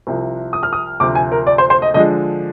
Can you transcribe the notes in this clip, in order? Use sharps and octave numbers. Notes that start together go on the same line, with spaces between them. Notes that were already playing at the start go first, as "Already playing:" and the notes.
C2 C3 F3
D#6
F6
D#6
D2 C3 F3 D6
G#5
A#4
D5
C5
C5
D#5
D3 F3 G#3 D#5